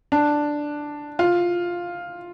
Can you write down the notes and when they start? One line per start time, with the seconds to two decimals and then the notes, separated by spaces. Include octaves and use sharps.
0.12 D4
1.19 F4